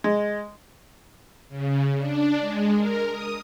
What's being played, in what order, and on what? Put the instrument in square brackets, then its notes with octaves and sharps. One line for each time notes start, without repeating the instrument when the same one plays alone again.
[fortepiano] G#3
[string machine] C#3
D4
G#3
A#4
D#6